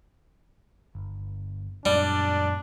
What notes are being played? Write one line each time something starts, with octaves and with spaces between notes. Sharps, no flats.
G1
F#2 A#2 G3 D4